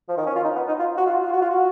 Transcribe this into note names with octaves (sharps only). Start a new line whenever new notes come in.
F3
D#3
C#4
F4
D#4
B3
D#4
F4
F#4
F4
F#4
F4
F#4
F4
F#4